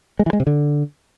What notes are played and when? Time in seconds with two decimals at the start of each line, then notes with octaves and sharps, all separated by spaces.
0.19 G#3
0.26 E3
0.33 G#3
0.40 C3
0.47 D3